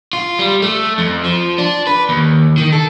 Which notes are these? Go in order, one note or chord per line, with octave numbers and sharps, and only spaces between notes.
F4
G3
A3
F2
F3
D4
B4
D#2
D#3
A4